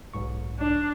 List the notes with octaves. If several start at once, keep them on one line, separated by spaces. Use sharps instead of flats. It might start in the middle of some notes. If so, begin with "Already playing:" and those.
B1 G#2 C#6
D4